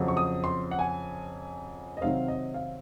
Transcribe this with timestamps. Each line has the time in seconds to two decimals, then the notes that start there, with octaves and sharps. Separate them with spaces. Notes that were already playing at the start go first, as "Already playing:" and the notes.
Already playing: F2 C#3 F#3 C4
0.08 C#6
0.17 D#6
0.44 C6
0.71 F#5
0.79 G#5
1.97 D#5
2.01 C3 D#3 F#3 C4 F5
2.28 D#5
2.54 F5